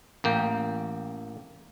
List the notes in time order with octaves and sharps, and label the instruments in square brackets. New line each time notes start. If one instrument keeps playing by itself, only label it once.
[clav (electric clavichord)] A1 A#3 G5